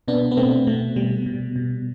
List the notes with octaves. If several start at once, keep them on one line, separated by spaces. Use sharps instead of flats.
B2 B3 D4
B3
B2 A3 C4
B2 A3
B2 G3
B2
B2